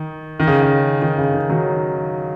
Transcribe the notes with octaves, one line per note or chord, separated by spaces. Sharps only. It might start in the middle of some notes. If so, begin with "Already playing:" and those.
Already playing: D#3
D#3
C#3
C#3
D#3
C#3
D#3
D#3 F#3